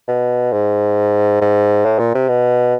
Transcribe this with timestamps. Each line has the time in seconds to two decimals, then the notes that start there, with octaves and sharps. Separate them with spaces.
0.08 B2
0.53 G#2
1.41 G#2
1.85 A2
1.99 A#2
2.15 C3
2.29 B2